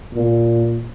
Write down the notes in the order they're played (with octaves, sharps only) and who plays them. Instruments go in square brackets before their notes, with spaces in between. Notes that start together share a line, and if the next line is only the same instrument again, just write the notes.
[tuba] A#2